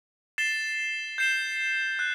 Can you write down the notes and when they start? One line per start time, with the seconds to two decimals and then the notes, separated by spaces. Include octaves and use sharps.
0.38 A6 C7 E7 G7
1.18 G6 C7 E7 G7
1.99 F#6